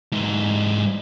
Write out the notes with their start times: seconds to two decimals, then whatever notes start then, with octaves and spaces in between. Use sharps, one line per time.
0.12 G#2 E3